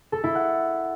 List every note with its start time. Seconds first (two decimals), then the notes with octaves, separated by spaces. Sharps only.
0.12 A4
0.24 E4
0.35 F#5